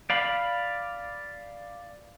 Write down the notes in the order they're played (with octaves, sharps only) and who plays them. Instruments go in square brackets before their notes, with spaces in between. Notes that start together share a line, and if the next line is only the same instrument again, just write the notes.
[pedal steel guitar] D5 F5 B5